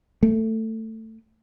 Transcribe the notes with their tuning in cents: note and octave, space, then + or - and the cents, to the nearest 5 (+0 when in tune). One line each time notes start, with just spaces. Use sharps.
A3 +15